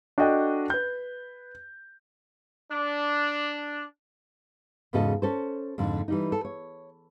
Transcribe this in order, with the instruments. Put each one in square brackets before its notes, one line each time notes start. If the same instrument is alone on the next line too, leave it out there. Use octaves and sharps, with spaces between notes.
[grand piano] D4 F#4 A4 D#5 G5
B4 G6
[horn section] D4
[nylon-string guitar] E2 G#2 C#3 F#4 A4 D#5
C#4 A4 C5
F2 G#2 D3
E3 G3 D#4
A4
C#5